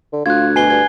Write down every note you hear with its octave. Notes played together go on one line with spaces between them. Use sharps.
D3
D2 F4 F#6 G#6
B2 G#5 C7 G7
G2 G#6 G7